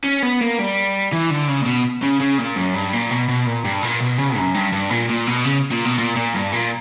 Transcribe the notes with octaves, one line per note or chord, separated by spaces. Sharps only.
C#4
B3
A#3
G3
E3
D3
C#3
A#2
B2
C#3
C#3
A#2
F#2
G2
A#2
B2
B2
A#2
G2
A#2
B2
C#3
F#2
G2
G2
A#2
A#2
B2
C#3
A#2
B2
A#2
A#2
G2
A#2